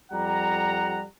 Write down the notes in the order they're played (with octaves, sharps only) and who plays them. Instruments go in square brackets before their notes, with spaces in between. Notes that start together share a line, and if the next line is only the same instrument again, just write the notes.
[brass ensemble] F2 G3 F#5 A#5